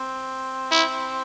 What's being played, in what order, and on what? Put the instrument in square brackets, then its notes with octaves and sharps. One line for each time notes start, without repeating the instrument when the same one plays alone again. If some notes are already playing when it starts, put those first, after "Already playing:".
Already playing: [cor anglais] C4
[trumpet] E4